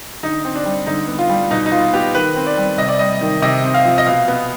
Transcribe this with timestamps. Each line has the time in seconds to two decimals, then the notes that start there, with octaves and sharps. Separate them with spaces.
0.23 D3 D#4
0.45 C4
0.56 D4
0.65 G3
0.87 D3 D#4
1.08 B3
1.18 F4
1.29 G3
1.51 B2 D#4
1.66 D#4
1.72 B2 F4
1.93 B3 G4
2.15 D#3 B4
2.36 C4
2.47 D5
2.57 G3
2.78 C3 D#5
2.88 D5
2.99 G3 D#5
3.21 D#3
3.42 C3 D#5
3.64 C4
3.74 F5
3.85 F3
3.98 D#5
4.06 B2 F5
4.28 B3